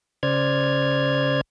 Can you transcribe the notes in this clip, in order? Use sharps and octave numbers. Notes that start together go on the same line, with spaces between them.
C#3 C5 D5 F6 G#6